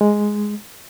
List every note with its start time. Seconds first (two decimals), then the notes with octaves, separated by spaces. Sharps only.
0.01 G#3